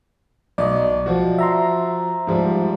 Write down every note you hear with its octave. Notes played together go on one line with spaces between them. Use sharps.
B1 D5 D#5
F3 F#4
E5 A#5 C6
G#2 F3 G3